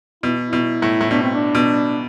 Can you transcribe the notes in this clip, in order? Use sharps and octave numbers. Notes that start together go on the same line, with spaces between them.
B2 E4
E4
B2
A2
A2
B2 D4
C4
D4
B2